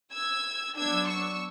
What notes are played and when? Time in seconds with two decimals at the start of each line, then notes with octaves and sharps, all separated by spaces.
0.12 E6 G#6
0.76 F#3 B3 D4 E6 G#6
1.08 C#6 E6